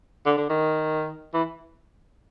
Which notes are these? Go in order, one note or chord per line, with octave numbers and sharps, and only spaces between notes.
D3
D3
D#3
E3